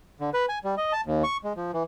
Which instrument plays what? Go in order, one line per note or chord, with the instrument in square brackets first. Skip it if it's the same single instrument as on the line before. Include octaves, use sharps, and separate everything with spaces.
[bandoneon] D3
B4
G#5
G3
D#5
A5
D#2
C#6
G#3
F3
E3